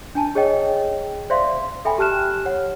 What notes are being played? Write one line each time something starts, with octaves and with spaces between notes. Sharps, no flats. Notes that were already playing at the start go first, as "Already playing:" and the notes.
D4 G#5 A5
G#4 C#5 D#5 G5
C5 D5 E5 F5 C6
A4 E5 G5 G#5 B5
G4 A5 F6 F#6 E7
C#5 F#5